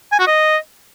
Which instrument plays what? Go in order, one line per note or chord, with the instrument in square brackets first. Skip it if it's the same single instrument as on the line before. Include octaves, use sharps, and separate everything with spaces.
[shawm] G#5
F#4
D#5